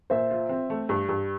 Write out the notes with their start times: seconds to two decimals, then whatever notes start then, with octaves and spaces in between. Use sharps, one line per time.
0.10 A#2 C5 E5
0.31 F4
0.49 C4
0.70 A3
0.89 G2
1.09 G2